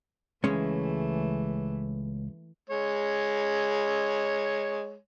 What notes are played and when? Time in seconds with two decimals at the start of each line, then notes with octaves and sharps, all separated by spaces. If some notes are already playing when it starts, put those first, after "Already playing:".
0.44 C#2 E3 G#3 A3 C#4
2.69 G#3 C#5